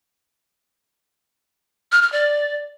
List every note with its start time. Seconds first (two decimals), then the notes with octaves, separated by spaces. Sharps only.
1.92 F6
2.02 F6
2.12 D5